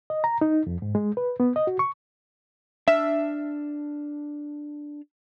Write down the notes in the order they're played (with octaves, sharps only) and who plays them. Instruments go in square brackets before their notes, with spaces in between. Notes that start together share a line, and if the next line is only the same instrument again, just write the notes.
[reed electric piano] D#5
A#5
D#4
F2
G#2
G#3
B4
B3
D#5
F#4
C#6
[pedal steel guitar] D4 A5 F6 [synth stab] E5